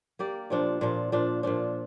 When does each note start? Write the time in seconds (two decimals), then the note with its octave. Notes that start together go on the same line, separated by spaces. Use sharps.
0.19 A#3 G4 D5
0.50 A#2 F3 D4
0.81 A#2 F3 D4
1.12 A#2 F3 D4
1.43 A#2 F3 D4